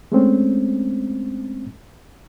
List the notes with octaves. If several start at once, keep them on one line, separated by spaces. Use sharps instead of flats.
G#3 A3 C4 C#4